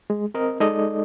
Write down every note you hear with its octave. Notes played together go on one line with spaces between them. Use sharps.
G#3
C4 A#4 D#5
G#3 D#4 A4 D5 D#5